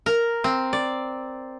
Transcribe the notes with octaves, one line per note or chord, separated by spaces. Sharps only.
A#4
C4
D5